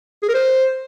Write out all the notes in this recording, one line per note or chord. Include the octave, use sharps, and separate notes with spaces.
G#4
A#4
C5